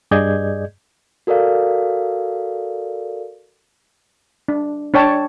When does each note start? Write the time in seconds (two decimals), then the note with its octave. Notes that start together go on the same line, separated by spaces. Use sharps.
0.11 G2 G#4 D5 D#5 G6 G#6
1.27 F#4 A4 A#4 D5 F5
4.48 D4
4.94 D4 C#5 G5 A5